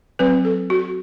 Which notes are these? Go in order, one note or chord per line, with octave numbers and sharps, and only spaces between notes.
F#3 C4 B4
A4
F#4